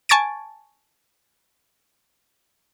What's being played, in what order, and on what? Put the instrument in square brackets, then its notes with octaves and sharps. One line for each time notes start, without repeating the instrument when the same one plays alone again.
[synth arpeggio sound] G#5 A5 C#6 G#6 A6 D7